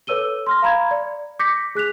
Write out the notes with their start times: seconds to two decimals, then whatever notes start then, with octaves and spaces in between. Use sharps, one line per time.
0.07 A4 B4 C#5 E6 D#7 G7
0.47 C6 F6 A#6
0.62 F5 A#5 B5 G#6
0.91 D5
1.39 D6 G6 A#6 B6 C#7
1.75 G#4 F#6 B6 F7